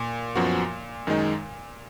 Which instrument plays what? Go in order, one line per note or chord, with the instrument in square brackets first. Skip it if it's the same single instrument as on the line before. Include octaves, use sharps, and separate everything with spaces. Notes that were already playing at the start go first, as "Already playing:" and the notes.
Already playing: [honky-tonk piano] A#2
[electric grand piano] F#2 F3 B3 F#4
F#2 D#3 G#3 D#4